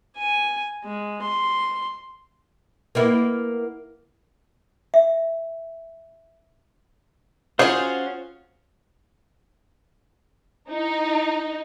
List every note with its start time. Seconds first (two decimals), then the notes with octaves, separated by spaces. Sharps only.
0.17 G#5
0.84 G#3
1.22 C6
2.95 A#3 B3 E4
4.94 E5
7.59 C#4 F4 F#4 G#4 C5 F#5
10.71 D#4 E4